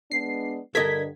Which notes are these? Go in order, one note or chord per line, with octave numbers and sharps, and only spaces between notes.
G#3 B3 D4 C7
G2 D3 A4 A#4 D#5 G#6 B6